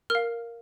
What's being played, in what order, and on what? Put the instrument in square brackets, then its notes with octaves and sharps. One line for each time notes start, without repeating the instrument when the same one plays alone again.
[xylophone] A#4 F5 F6